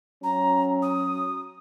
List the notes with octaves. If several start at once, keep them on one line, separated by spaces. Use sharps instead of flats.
F#3 C#4 A#5
D#6